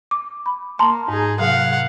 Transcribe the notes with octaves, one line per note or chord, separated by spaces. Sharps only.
D6
B5
A#3 A5 A#5 C6
G#2 D#4 G#4
C3 F#3 F5 F#5